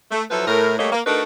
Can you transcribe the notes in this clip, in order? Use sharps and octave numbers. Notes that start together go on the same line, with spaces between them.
A3
F3 F#3 E4 A4 B4
A2 A#4
G3 A3 A#3 G#4 C#5 D#5
A#3
A3 D4 D#4 F#4 A#4 B4